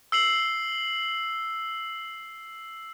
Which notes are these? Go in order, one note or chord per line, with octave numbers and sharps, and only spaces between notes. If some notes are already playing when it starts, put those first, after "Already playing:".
E6 C7 F#7